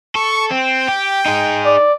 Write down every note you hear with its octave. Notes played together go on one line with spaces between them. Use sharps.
A4 C#6
C4 G5
G4
D#4 G#4
D5